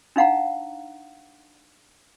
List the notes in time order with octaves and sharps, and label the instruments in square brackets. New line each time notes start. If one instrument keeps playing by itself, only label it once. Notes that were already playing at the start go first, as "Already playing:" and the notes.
[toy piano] D4 D#4 F5 F#5 A#5